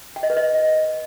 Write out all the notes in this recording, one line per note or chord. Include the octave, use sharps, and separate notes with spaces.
G5
D#5
B4
D#5